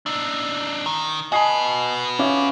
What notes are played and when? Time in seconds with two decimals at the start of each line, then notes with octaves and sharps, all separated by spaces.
0.06 D4 D#4 E6
0.86 D#3 A#5
1.32 F#4 B4 D#5 G#5 A5 D#6 C7
2.19 C#4 E5 F5 D6